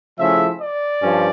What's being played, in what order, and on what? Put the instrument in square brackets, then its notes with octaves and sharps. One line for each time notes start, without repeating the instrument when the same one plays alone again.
[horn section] C#3 F3 A3 C#4 E4 E5
D5
G2 F3 C#4